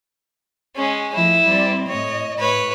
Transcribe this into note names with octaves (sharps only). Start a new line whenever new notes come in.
G#3 C#4
F3 A3 E4
G3 C4 D5
A2 C#5 D#5
A2 B4 C#5